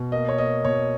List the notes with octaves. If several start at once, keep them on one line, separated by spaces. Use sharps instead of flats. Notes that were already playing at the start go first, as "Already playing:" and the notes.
Already playing: B2
A#3 D#5
C#5
A#3 D#5
B2 C#5